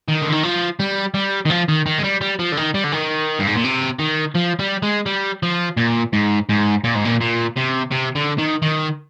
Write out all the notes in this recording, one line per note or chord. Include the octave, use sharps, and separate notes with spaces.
D#3
D3
D#3
F3
G3
G3
D#3
F3
D#3
D#3
G#3
G3
G3
F3
D3
D#3
G3
D3
D#3
G2
G#2
A#2
C3
D#3
F3
G3
G#3
G3
F3
A#2
G#2
G#2
A#2
G#2
A#2
A#2
C3
C3
D3
D#3
D#3